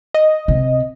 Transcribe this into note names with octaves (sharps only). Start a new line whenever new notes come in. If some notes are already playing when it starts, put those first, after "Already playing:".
D#5
C3